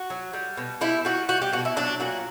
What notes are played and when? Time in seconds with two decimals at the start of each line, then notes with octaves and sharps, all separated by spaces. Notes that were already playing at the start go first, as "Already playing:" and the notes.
Already playing: F#4
0.10 F#3
0.33 G3
0.57 B2
0.81 G3 E4
1.05 G3 F#4
1.28 G3 F#4
1.42 G4
1.53 B2 F#4
1.65 E4
1.76 F#3 D4
2.00 A#2 F#4